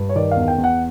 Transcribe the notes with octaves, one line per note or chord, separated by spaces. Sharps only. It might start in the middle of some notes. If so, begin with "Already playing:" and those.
Already playing: G2
C#5
D#3 D5
F5
E2
G5
E2
F#5